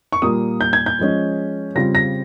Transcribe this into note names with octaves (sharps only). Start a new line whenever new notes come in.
C#6
A#2 G3 A#3 F4 D#6
G6
G#6
G6
F3 G#3 C#4
C#3 G3 C4 F4 A#6
A#6